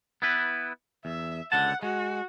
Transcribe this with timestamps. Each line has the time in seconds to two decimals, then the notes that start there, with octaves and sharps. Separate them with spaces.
0.22 B3 E4 B4
1.05 E2 E5
1.52 C#2 D3 F#5 A5
1.83 G#3 F#4